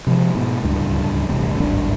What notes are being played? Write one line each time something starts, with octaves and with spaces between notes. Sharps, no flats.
C3 F3 G#3
G#2 B2
D1 C#2 G2
D#1 A1 G2 C3
D1 G#1 G2 D4